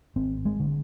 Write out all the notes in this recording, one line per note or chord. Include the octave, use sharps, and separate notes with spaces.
G#1 C4
G#3
D3